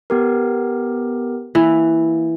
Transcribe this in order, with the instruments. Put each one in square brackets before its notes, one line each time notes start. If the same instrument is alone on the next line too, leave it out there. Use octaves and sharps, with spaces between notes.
[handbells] B3 G4 A#4
[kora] E3 [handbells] A#3